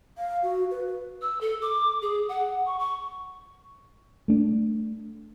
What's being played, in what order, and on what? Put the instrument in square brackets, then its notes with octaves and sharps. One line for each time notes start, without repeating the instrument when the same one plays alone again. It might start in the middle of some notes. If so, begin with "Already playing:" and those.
[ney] F5
F#4
B4
B4
[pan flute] E6
A4
D6
G#4
F#5
C#6
C#6
[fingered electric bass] A3 D4